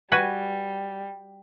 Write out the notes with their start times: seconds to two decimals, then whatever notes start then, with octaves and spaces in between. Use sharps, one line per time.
0.12 G3 F#4 B4 G#5